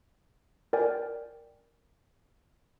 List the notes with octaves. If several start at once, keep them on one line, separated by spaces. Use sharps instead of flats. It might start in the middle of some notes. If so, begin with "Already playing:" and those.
A#4 D5 G5 G#5